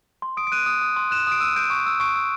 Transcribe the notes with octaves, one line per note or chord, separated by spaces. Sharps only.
C6
D#6 D7
D7
F#6 D#7
D#6
D#6
C6
F#6 E7
D#6 D7
E6 D#7
G6 D7
C#6
E6
C#6 D7
E6